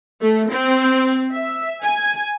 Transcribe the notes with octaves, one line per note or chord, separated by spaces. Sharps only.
A3
C4
E5
G#5